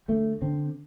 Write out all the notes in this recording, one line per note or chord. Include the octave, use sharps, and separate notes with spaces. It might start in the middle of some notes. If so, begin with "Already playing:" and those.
D2 A3
D3 C4